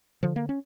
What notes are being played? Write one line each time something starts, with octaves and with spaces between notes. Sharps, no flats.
D3 F3
A#3
C#4